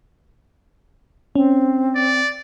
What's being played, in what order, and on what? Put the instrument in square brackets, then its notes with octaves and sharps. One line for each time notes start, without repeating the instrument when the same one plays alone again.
[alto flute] C4 [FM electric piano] C#4
[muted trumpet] D5